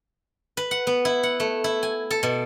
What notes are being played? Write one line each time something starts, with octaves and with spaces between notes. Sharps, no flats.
B4
F#5
B3
E4
F#5
A3
E4
G#5
A4
B2